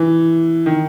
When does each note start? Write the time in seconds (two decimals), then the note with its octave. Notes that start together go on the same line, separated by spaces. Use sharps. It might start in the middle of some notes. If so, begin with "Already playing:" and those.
Already playing: E3
0.66 D#3